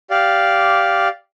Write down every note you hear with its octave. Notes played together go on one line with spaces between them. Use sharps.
G4 D5 F5